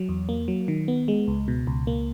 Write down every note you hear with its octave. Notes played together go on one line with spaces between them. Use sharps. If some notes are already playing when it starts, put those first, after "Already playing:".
Already playing: F#3
E2
A#3
F#3
D#3
B3
G#3
C#2
B2
C#2
A#3